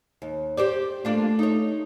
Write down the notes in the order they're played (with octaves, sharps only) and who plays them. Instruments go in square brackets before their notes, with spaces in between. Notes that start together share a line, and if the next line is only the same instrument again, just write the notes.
[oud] D#2
G4 C5 D5
[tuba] A3 [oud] A#3 D4 F4
[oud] D#4 C#5